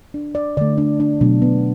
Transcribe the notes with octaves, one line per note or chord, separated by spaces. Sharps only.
D4
D5
D3 A3 D5
D4
D4
B2 F#3 A3 D4
B3